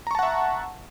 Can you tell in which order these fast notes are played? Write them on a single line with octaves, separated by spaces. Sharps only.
A#5 C#6 A5 F#5 E5